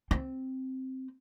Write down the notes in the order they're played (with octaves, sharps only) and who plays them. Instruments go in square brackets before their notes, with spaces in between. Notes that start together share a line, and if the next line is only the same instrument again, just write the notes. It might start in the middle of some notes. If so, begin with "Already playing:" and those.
[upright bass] C4